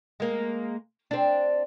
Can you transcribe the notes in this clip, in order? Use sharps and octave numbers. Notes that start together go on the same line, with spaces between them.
G#3 A#3
C4 D4